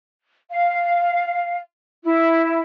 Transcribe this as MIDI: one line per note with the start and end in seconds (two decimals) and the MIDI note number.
0.50 1.58 77
2.04 2.63 64